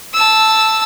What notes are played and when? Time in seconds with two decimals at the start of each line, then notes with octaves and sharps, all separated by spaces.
0.13 A5 E6